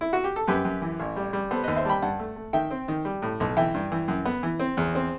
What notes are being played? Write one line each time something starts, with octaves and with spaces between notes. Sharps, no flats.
E4
F#4
G4
A4
F#2 G4 B4
F#2
E3
A1
G3
G3
B3 A4 C5
D#2 B4 D#5
C5 E5
G3 G5 A5 B5
G2 F#5 A5
A3
A3
D#3 E5 G5
C4
D#3
G3
A2
B1
E3 E5 G5
G2
E3
F#2
B3
E3
C4
E2
C4